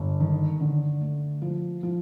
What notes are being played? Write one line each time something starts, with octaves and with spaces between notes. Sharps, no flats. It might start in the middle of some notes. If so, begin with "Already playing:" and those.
Already playing: G1
D#3
D3
A3
F3
F3